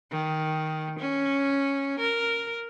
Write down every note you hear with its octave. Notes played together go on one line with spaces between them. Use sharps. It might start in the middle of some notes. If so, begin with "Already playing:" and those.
D#3
C#4
A#4